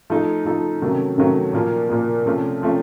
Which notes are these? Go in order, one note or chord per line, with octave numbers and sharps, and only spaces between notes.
F3 A3 D#4 A4
F3 A3 D#4 A4
C3 D#3 F#3 A3 C#4
C3 D#3 F#3 A3 C#4
A#2 F3 A#3
A#2 F3 A#3
C3 F3 A3 C#4
C3 F3 A3 C#4